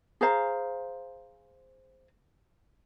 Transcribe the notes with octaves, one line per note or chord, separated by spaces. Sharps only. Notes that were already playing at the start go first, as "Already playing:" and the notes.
G#4 C5 F5 A#5